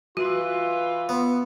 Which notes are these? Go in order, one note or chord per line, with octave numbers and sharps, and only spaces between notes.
E3 F4 F#4 B4 C6
B3